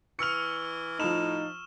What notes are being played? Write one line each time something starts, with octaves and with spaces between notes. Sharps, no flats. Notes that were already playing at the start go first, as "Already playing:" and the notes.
E3 C#6 E6 F6 C#7 F7
A2 F3 D#4 E7 F7